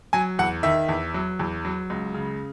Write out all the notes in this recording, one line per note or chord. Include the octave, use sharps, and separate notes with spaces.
F#3 G#5
E2 F#5
D#3 E5
E2
F#3
E2
F#3
C#2
C#3